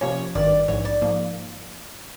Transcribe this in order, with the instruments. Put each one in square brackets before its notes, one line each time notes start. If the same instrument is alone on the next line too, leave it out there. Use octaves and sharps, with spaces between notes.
[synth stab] C3 F3 A#3 C#4 [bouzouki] C#5
[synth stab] G#1 G2 D#3 [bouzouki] D5
[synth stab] A#1 G#2 E3 [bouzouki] C#5
[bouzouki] D5
[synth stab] G#2 F3 A#3